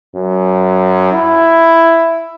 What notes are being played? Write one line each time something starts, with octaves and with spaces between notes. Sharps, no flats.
F#2
E4